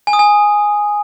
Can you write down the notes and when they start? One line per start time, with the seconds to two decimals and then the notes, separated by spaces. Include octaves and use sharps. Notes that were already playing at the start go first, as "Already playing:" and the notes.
0.07 G#5
0.13 D#6
0.19 G#5